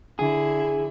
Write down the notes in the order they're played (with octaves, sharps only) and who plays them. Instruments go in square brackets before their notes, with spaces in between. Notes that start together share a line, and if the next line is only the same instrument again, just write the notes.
[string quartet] D3 E4 [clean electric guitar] G#4